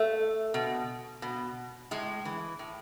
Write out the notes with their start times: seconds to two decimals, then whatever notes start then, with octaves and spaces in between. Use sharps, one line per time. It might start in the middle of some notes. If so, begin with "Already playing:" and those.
Already playing: A3
0.54 B2
1.22 B2
1.91 A2 G#3
2.25 E3
2.59 A2